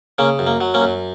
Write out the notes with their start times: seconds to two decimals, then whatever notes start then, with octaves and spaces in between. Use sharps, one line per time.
0.18 C#3 A#3 C#4
0.39 F#2
0.47 A#3
0.61 F#3
0.74 A#3 C#4
0.81 F#2